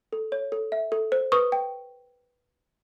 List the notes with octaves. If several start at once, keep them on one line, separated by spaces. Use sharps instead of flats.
A4
C#5
A4
E5
A4
C5
B4 C#6 D#6
G5